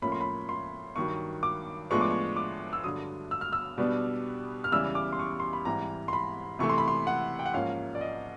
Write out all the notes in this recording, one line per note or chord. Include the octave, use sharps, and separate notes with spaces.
A2 F3 A#3 C#4 B5
C6
B5
C6
G2 D#3 F#3 C#6
D6
A2 F3 G#3 B3 D4 C#6
D6
C#6
D6
E6
G2 D3 F#3 D#6
E6
F6
E6
B2 G3 B3 D4
F6
E2 C#3 E3 G3 E6
D6
C6
C#6
C6
B5
G#2 E3 G3 C4 A#5
C6
B5
C3 E3 A3 C#6
C6
B5
C6
F#5
G5
F#5
G#2 F3 A#3 C#4 F5
D5
D#5